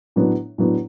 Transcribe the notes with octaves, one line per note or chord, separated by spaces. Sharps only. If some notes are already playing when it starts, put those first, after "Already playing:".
A2 F#3 B3 D4
A2 F#3 B3 D4